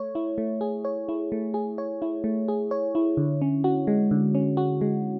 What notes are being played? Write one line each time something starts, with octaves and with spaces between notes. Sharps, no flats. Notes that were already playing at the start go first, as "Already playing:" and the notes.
Already playing: A3 C#5
E4
A3
G#4
C#5
E4
A3
G#4
C#5
E4
A3
G#4
C#5
E4
D3
C#4
F#4
G#3
D3
C#4
F#4
G#3